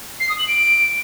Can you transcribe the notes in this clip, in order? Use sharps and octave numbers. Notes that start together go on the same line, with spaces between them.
C7
D#6
F#7
D7